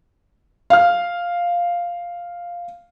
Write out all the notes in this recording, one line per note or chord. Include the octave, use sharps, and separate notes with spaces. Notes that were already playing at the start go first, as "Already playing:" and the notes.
F5 F6